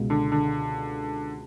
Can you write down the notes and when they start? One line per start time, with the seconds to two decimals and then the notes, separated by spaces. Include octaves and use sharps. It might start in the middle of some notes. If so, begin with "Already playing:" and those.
Already playing: C#2 B2 G#3
0.10 D3
0.32 D3